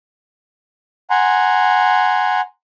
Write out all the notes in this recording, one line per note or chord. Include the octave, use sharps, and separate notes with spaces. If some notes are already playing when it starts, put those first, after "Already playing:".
F#5 G#5 A#5 C6